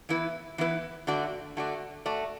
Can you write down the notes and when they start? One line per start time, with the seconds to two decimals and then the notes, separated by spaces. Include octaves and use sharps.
0.09 E3 B3 E4 B4
0.58 E3 B3 E4 B4
1.07 D3 A3 F#4 D5
1.57 D3 A3 F#4 D5
2.06 A3 F#4 D5